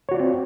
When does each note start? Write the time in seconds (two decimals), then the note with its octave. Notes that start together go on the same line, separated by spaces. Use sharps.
0.09 C#5
0.11 F#4
0.14 D5
0.17 F4
0.20 C4